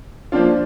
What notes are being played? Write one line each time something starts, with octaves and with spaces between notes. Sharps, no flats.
F3 A#3 D4 F4